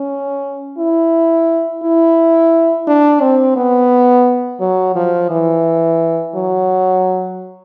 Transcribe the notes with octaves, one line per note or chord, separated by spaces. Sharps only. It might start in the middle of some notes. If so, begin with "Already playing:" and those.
Already playing: C#4
E4
E4
D4
C4
B3
F#3
F3
E3
F#3